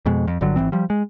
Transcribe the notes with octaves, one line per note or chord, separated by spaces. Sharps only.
F2 B2 G#3
F2
G1 G2 D3 F#3
G#1 F2 E3 C4
F3 G3
G#3